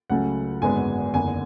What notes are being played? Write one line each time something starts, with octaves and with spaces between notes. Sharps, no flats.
C#2 C#3 F#3 A3 C#4 F#5
G#1 F#2 D3 G#3 B3 G#5
F#1 E2 D3 G#5